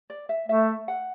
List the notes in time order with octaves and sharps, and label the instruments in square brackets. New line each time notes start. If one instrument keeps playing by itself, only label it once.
[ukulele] D5
E5
[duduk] A3 [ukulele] E5
[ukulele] F#5